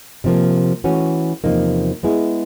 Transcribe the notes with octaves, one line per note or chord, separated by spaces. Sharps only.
C3 F3 A#3
E3 A3 C#4 F#4
E2 C3 F3 A#3 D#4
G#3 B3 E4 G#4